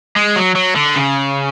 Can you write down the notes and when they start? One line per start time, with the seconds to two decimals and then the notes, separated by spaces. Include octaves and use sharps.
0.16 G#3
0.36 F#3
0.55 F#3
0.76 D3
0.95 C#3